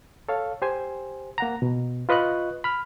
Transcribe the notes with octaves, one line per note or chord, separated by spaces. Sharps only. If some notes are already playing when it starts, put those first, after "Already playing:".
A4 C#5 F5
G4 C5 G#5
A#3 F#5 A#5
B2
F4 B4 D#5 C#6 F#6
B5 F6